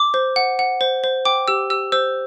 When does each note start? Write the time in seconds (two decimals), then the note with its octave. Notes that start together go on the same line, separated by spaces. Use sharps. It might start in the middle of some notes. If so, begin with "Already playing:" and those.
Already playing: D6
0.14 C5
0.36 F#5
0.59 F#5
0.81 C5
1.04 C5
1.25 G5 D6
1.48 G4 E6
1.70 G4 E6
1.92 C5 E6